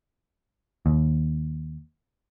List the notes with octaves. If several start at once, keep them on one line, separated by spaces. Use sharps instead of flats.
D#2